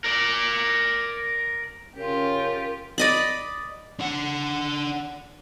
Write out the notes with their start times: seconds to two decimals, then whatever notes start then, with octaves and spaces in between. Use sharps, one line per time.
0.04 A#4 D5
1.96 C#3 C#4 F4 G4 A#4
2.98 D5 D#5 B5
3.99 D4 F#5